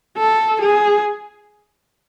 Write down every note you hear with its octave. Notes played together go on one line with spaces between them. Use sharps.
A4
G#4